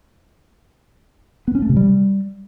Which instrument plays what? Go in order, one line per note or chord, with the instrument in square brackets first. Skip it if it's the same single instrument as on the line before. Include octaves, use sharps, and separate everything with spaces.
[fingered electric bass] B3
C#4
A3
C3
G3